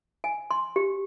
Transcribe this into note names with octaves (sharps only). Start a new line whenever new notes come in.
G#5
C6
G4